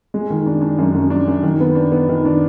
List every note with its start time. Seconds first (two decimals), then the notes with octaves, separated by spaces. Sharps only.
0.14 G#3
0.30 D#3
0.46 D4
0.62 D4
0.78 F#2
0.95 F#2
1.10 D4
1.28 F#2
1.43 D#3
1.60 B3
1.75 D4
1.92 B3
2.09 D#3
2.25 D4